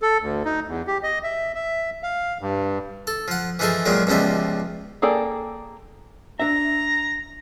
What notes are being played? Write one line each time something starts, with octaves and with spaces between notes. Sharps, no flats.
A4
D2
D#4
E2
G4
D#5
E5
E5
F5
G2
A4
F3 F#5
E3 F3 D#4 G#4 A4
A#2 D#3 F3 F#3 G#3
C#2 B2 F3 G3 D#4 E5
A#3 G#4 A4 D5 G5
D4 E5 A#5